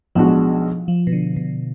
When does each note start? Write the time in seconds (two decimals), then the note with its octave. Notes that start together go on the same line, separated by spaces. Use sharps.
0.15 B1 B2 F3 G#3 D4 F#4
0.88 F3
1.07 B2
1.12 D3
1.36 B2